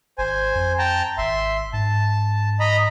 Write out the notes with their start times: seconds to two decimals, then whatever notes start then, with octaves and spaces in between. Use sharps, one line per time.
0.18 G#1 C5 G#5
0.55 F2
0.78 G5 A5 A#5
1.18 G#1 E5 C6
1.73 G#2 A5
2.60 D#5 A#5 B5